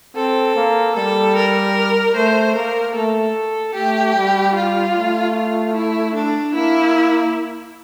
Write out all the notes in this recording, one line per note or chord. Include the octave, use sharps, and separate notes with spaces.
C4 A4
A#3
G3 A4
A#4
A3 C5
A#3 A#4
A3 A4
A3 G4
G3
F4
A3
F4
E4
D4
A#3 E4